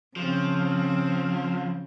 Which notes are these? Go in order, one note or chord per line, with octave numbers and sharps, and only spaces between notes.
C#3 F3 C4